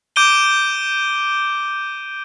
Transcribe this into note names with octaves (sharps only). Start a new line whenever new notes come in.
D6 G6 D7 D#7 G7